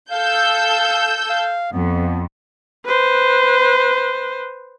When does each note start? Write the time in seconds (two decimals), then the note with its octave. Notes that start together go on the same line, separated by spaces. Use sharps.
0.11 A4 F5 E6 G6
1.30 F5
1.73 F2 B3
2.86 B4 C5